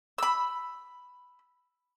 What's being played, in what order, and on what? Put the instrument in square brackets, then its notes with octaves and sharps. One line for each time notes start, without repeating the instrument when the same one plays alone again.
[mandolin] B5 E6